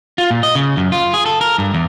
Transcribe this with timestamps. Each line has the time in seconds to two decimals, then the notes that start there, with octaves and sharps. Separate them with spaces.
0.18 F4
0.31 A#2
0.43 D#5
0.55 C#3
0.77 F#2
0.92 F4
1.14 G#4
1.26 A4
1.41 A#4
1.58 G2
1.74 E2